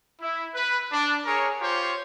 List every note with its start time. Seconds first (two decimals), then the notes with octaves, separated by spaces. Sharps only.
0.22 E4
0.55 B4
0.92 D4
1.26 G#4 A#4 C#5
1.60 F4 G4 C5 C#5